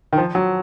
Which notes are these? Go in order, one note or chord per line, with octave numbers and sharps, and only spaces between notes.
D#3
F3
F#3